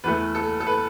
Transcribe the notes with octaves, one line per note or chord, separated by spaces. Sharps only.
E2 E3 A3 B4
A4
A4
B4